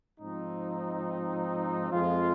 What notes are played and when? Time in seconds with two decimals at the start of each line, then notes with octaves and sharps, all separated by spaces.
0.18 G#2 F3 C4 D#4
1.91 F2 F3 G#3 F4